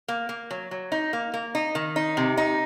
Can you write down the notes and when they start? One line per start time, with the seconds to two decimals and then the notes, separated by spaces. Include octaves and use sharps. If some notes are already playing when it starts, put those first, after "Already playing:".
0.08 A#3
0.29 A#3
0.51 F#3
0.71 F#3
0.92 D#4
1.13 A#3
1.34 A#3
1.55 D#4
1.75 D#3
1.96 D#4
2.17 C3
2.37 D#4